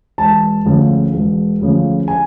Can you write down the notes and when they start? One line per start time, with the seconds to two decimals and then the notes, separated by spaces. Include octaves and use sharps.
0.18 E1 A5
0.66 D2 C#3 F3
1.13 E1
1.61 D2 C#3 F3
2.08 G#5